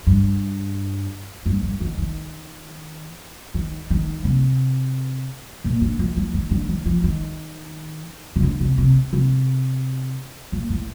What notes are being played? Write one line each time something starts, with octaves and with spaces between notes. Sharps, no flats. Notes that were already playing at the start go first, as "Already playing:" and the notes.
G2
G2
G2
D#3
D#3
D#3
D#3
C3
A#2
D3
F3
F3
D#3
D3
D#3
F3
D#3
C3
D3
C3
C3
C3
A#2
A2